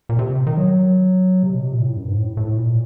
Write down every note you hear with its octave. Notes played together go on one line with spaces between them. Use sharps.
A#2
C3
D#3
F#3
C3
B2
C3
A#2
A2
F#2
G2
G#2
A2
A2
A#2